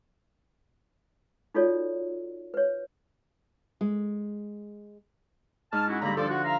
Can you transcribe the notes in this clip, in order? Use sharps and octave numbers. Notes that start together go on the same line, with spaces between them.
D#4 F4 F#4 A4 C#5 D5
B4 C#5
G#3
G#2 D#4 A5 F6
C#4 E4 F#4
G2 D3 A#3 A#5 B5
F3 D4 A4 D5
F#4 F#5
E5 F5 A#5